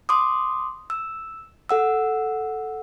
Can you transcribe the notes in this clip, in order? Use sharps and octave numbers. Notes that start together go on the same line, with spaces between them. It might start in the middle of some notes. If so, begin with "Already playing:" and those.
C6 D6 D#6
E6
A4 F#5 E6